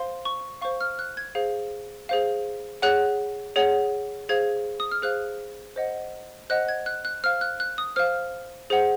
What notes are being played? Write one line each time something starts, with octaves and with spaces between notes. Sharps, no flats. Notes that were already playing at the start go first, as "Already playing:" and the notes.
Already playing: C5 F5 C6
C#6
C5 F5 C#6
F6
F#6
G#6
G#4 C5 F5
G#4 C5 F5
G#4 C#5 F#5 F#6
G#4 C#5 F#5
G#4 C5 F5 G#6
D#6
F6
G#4 C5 F5 F#6
C5 D#5 F#5
C5 D#5 F#5 F#6
G#6
F#6
F#6
C5 F5 F6
F#6
F#6
D#6
C5 F5 F6
G#4 C5 F#5